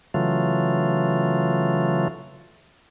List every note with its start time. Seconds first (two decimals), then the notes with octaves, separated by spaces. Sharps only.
0.14 C#3 E3 F#3 A3 F4